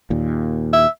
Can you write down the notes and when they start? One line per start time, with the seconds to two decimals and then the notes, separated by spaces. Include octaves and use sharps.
0.10 D#2 A#2
0.73 E5